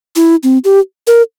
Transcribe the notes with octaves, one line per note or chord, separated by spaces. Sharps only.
E4
C4
G4
A#4